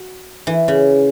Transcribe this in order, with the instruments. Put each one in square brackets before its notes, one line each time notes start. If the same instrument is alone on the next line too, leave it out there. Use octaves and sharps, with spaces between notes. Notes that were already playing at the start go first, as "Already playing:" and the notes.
Already playing: [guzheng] F#4
E3
C#3